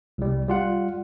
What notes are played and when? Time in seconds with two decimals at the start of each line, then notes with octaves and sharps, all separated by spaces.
0.18 C2 G3
0.48 G3 F4 F#5